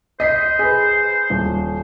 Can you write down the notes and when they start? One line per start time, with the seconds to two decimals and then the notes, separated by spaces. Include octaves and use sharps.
0.20 C5 D#5 B6 C7
0.59 G#4 B4
1.30 D#1